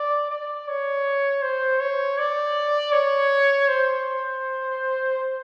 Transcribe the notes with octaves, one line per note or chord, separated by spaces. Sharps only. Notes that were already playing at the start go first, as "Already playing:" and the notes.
Already playing: D5
D5
C#5
C5
C#5
D5
C#5
C5